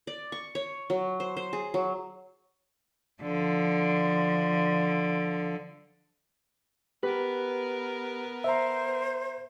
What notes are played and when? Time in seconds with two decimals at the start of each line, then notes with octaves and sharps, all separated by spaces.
0.07 D5
0.32 C#6
0.55 C#5
0.90 F#3
1.20 C5
1.37 C5
1.53 G#4
1.74 F#3
3.22 D3 F3
7.03 B3 G4 A#4 B4
8.44 C5 E5 A#5